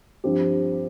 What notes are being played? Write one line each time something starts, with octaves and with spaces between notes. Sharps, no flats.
G2 F3 C4 G4